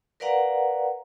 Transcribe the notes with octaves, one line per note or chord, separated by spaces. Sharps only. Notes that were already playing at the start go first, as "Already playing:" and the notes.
A#4 B4 D5 F5 F#5 A#5